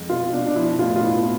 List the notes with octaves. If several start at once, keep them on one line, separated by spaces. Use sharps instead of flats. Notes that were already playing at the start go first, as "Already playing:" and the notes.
Already playing: F2 G#3
B2 F4
B2 D4
D4
F3 E4
A2 F4
F4
B3 E4